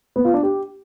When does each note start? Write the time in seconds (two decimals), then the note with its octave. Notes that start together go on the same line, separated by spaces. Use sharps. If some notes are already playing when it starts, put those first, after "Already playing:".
0.16 B3
0.25 F4
0.34 D4
0.43 G4